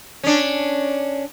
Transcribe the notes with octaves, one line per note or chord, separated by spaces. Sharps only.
C#4 D4